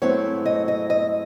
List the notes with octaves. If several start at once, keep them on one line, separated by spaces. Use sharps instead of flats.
G#2 F#3 A3 C4 E4 C#5
D#5
D#5
D#5